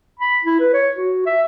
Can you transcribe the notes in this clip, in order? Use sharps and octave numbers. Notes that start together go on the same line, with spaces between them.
B5
E4
B4
C#5
F#4
E5